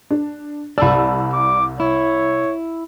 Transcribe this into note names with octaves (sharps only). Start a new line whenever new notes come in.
D4
C2 D5 A5 B5 E6
D6
E4 C#5